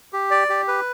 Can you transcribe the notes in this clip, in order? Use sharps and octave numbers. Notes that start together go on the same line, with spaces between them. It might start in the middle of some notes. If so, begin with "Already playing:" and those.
G4
D5
G4
B4